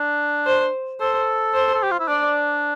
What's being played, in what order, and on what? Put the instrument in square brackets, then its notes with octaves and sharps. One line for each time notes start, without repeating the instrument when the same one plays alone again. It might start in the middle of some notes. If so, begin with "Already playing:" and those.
Already playing: [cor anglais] D4
[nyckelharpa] C5
[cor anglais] A4 [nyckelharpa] C5
[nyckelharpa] C5
[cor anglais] A4
G4
F4
E4
[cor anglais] D4 [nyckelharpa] D5